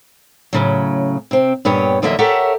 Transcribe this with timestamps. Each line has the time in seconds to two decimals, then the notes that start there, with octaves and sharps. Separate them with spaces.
0.53 A2 C#3 F#3
1.31 C3 C4
1.65 G2 A#2 B3 G4 C#5
2.02 E2 D3 F#3 A#3 D#5 E5
2.19 G4 A4 A#4 C#5 E5 F#5